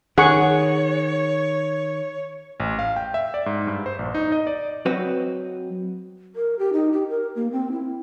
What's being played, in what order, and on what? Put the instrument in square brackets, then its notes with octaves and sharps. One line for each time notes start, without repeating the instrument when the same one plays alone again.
[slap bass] D#3 [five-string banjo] G#4 [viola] C#5 [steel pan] F#5 C#6
[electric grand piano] A1
F5
G5
E5
D5
G#2
G2
C5
A#1
D#4
D#5
D5
[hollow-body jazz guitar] F#3 C4 F#4 B4 D#5
[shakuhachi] A#4
G4
D#4
G4
A#4
A#3
C4
E4